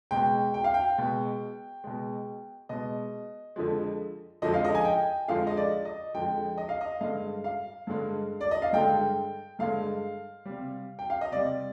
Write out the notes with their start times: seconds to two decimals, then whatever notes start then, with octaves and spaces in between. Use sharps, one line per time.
0.11 B2 G#3 G5
0.54 G5
0.64 F5
0.74 G5
0.98 B2 G#3
1.84 B2 G#3
2.69 B2 G#3 D#5
3.56 F2 D3 F3 G#3
4.42 F2 D3 F3 G#3 D#5
4.54 F5
4.65 D#5
4.75 G#5
4.85 G5
5.28 F2 D3 F3 G#3 F5
5.47 D#5
5.57 D5
5.85 D#5
6.14 F2 D3 F3 G#3 G5
6.58 D#5
6.69 F5
6.81 D#5
7.01 G2 D3 G#3 F5
7.44 F5
7.87 G2 D3 G#3
8.41 D5
8.51 D#5
8.62 F5
8.73 G2 D3 G#3 G5
9.59 G2 D3 G#3 F5
10.45 C3 G3
10.99 G5
11.10 F5
11.21 D#5
11.32 C3 G3 D5